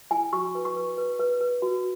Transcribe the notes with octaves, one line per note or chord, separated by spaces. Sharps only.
E4 G#5
F#4 C#6
B4
C#6
B4
B4
B4
B4
F#4